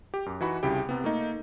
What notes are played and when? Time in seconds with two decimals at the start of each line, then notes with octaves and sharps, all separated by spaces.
0.14 G4
0.26 F#2
0.41 E3 D#4 F#4 F#5 B5
0.63 C2 C#3 E4 G4 G5
0.89 C3 B3
1.04 A3 A#3 D#4